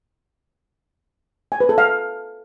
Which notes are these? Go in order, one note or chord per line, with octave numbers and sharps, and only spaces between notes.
G#5
B4
A4
F5